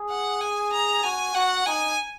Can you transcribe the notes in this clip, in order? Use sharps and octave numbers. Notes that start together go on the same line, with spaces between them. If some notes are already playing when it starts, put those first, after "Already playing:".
Already playing: G#4
F#5
G#5
A#5
F#4 G#5
F#4 F#5
D#4 G#5